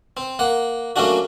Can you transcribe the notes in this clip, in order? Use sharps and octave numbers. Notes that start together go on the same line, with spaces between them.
C4
A#3 F#5
F#3 A3 A#3 C#4 D4 F#4